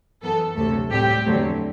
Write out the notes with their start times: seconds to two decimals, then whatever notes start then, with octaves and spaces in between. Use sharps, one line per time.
0.22 F#2 E3 B3 A4
0.56 D2 C3 F#3 A3 A4
0.91 A2 G3 C4 G4
1.25 E2 D3 F#3 A3 C4